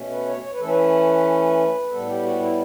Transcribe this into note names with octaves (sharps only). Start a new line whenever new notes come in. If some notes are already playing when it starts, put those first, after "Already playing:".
Already playing: B2 A3 C#4
B4
C#5
C#5
B4
E3 A3 C#4 A4
B4
A2 G3 B3 A4
G4
F#4
E4